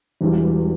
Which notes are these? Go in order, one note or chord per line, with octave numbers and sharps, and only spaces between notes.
E1 E2 E3 G3